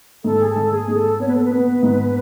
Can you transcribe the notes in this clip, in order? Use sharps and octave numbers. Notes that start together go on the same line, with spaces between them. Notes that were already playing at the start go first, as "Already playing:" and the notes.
G#2 A4
G#4
A4
G#2
G#4
G#2
A4
B3 C#5
B4
A4
B4
B3
G#2